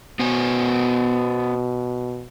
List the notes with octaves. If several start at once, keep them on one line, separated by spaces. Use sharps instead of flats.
B2 B3 C5 G#5